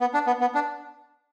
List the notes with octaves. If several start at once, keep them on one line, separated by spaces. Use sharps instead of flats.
B3
D4
B3
B3
D4